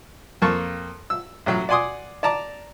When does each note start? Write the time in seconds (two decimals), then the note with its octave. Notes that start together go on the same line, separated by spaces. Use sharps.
0.42 F2 A#3 A5 C#6 F6
1.10 E6
1.46 A1 F#3
1.69 D5 F#5 G#5 C6 D6 D#6
2.23 D5 A5 A#5 D6